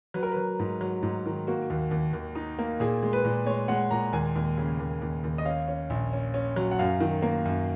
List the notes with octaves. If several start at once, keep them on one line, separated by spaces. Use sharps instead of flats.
F#3 B4
A#4
F#3 B4
G#2
F#3
G#2
D#3
A#3 F#4
D#2
D#2
D#2
D#4
A#3
A#2 G#4
G#3
B4
A#2
G#3 C#5
G#3 F#5
A#2 A#5
D#2 G#5
D#2
C#3
D#2
D#2
D#2
D#5
C#4 F5
C#4
A#1
C#4
C#4
F#3
F#5
F#2 F5
D#3
A#3
F#2